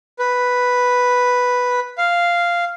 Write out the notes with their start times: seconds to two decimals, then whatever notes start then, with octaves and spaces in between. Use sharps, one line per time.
0.19 B4
1.98 F5